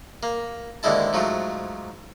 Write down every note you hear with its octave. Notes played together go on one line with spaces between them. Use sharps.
A#3
D#2 G#2 D3 G#3 E4 A5
G#2 F3 F#3 A3